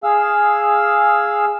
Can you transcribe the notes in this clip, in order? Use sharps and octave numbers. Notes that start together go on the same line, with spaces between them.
G#4 F5 E6